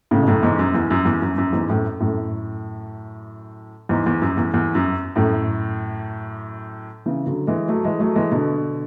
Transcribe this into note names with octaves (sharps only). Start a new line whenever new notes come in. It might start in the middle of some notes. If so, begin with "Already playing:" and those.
A2 C#3
B2
F#2 A2
E2 G#2
F#2
E2
F#2
E2
F#2
F#2
E2 G#2
F#2 A2
F#2 A2
E2 G#2
E2
F#2
E2
E2
F#2
F#2 A2
C#3 E3
D3 F#3
E3 G#3
F#3 A3
E3 G#3
F#3 A3
E3 G#3
B2 D3